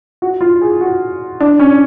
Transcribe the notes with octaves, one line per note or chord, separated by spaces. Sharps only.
F#4
F4
G#4
F#4
D4
C#4